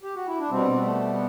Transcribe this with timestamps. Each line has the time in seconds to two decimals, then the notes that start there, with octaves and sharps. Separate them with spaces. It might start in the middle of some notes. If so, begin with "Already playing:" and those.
0.03 G4
0.15 F#4
0.27 E4
0.39 D4
0.50 B2 G3 C4
0.81 A3
1.13 B3